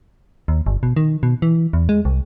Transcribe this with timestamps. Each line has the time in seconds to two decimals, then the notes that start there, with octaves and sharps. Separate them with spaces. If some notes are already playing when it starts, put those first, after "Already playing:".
0.48 D#2
0.66 G1
0.83 B2
0.96 D#3
1.23 B2
1.42 E3
1.73 E2
1.89 G#3
2.05 C2